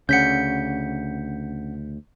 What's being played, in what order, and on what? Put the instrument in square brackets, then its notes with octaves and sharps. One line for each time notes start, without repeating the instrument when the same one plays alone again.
[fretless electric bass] D2 C#3 [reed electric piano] C#4 F#5 [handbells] G6 B6 C#7